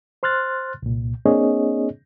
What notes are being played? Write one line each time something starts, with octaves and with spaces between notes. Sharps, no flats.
C5 C6 F6 F#6 A6
C2 A#2
A#3 C4 D4 G#4 C#5 D#5